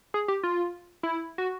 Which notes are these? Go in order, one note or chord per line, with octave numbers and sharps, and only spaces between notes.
G#4
G4
F4
E4
F#4